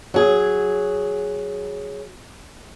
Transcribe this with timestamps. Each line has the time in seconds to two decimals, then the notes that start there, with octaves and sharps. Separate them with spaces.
0.14 F#3 G#4